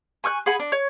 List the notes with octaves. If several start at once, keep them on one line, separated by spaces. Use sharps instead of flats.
G#5 C#6 F6 F#6
G#4 F#5 G#5 B5
D4
C#5